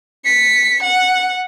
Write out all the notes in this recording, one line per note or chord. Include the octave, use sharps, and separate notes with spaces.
B6 C#7
F#5